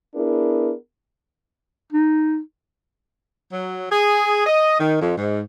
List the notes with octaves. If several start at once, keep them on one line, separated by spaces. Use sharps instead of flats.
B3 D4 E4 G#4 A#4
D#4
F#3
G#4
D#5
D#3
F2
G#2